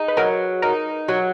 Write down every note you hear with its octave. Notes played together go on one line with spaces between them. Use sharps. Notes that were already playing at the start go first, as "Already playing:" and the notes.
Already playing: D#4 G#4
B4
F#3 A#4
D#4 A#4
F#3